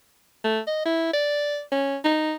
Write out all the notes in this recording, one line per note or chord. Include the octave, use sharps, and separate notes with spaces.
A3
D#5
E4
D5
C#4
D#4